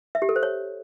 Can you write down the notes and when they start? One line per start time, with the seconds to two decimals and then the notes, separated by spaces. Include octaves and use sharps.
0.15 E5
0.22 G4
0.29 A4
0.36 C5
0.43 C#5